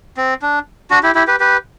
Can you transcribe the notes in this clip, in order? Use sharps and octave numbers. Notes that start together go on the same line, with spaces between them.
C4
D4
D4 F#4
E4 G4
E4 G4
G4 B4
G4 B4